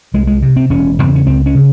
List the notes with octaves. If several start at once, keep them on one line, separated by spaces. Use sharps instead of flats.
C2 G#3
G#3
C3
C4
E1 C#4
E2 C#3 C4
C#4
C#2 C4
C#4
C#3